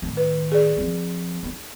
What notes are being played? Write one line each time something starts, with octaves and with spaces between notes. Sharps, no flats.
A2 D#3
B4
G#4 D5
F3 C4
B3 D#4